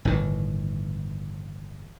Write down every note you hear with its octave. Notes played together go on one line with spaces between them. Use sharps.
G1 A2 D#3 E3